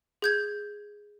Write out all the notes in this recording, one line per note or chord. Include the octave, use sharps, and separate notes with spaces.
G#4 G6 G#6